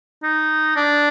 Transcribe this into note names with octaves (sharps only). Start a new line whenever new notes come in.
D#4
D4